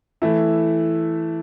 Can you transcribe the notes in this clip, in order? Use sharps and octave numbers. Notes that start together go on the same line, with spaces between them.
E3 A3 E4